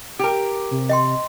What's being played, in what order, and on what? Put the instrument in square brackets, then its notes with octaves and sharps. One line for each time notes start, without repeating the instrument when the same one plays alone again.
[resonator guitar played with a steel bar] G4 A#4
[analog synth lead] C3
[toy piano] D#5 G5 C6